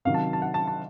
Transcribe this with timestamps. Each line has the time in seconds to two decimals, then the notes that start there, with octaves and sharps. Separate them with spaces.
0.05 C3 D#3 F#3 F5
0.14 A5
0.33 A5
0.42 F#5
0.54 A5
0.67 A5